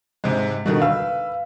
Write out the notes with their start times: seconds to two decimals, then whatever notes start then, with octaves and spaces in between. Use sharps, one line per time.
0.24 G#2 C3 G#3
0.66 B2 D3 D#3 G3
0.82 B4 F5 E6